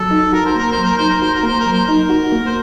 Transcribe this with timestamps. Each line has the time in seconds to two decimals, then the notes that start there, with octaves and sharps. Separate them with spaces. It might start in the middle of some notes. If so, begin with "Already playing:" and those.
Already playing: F#3 A4
0.11 D#4
0.33 F#4 A#4
0.46 C5
0.55 A#3 A#4
0.72 C5
0.77 F#3
0.84 A#4
0.97 D#4 C5
1.10 A#4
1.22 F#4 C5
1.34 A#4
1.43 A#3 C5
1.60 A#4
1.66 F#3
1.73 C5
1.86 D#4 A#4
2.10 F#4
2.32 A#3
2.46 C5